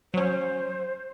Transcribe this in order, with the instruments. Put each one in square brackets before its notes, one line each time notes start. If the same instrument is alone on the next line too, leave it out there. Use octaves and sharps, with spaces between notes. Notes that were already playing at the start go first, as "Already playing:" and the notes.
[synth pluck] F#3 C#4 [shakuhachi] C5